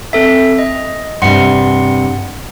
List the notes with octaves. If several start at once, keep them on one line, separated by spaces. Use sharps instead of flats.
C4 A4 E5
D#5
G2 C3 F#5 C6